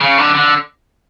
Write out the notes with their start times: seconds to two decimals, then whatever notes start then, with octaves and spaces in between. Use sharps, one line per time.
0.01 C#3
0.18 D3
0.35 D3